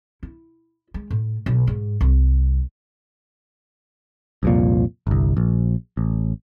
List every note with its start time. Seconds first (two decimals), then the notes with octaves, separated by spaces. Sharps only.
0.23 E4
0.94 G#3
1.11 A2
1.46 B1
1.67 G#2
2.01 C2
4.43 C2 F2 A#2
5.07 G1 C2
5.37 A#1
5.97 A1